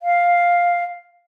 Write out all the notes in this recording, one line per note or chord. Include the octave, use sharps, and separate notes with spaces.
F5